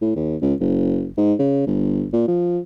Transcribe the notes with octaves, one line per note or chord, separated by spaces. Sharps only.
A2
D#2
C#2
F#1
G#2
C#3
G1
A#2
F3